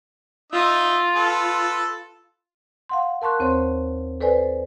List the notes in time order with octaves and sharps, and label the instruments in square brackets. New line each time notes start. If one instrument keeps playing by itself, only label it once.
[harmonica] D#4 D#5 E5 [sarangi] F4
[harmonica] A4 B4
[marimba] F5 F#5 C6
A#4 A5 C6 C#6 F#6
D#2 C4 C5 C#5 C6
A4 B4 C5 D5 G#5